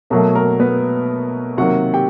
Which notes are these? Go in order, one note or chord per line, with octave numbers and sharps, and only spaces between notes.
B2 F#3 A3 A#3 A#4
A#3 A#4
B3 B4
C3 D#3 F#3 A#3 F#4 F#5
G4 G5